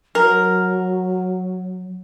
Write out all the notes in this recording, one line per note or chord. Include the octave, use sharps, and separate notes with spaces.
F#3 A#4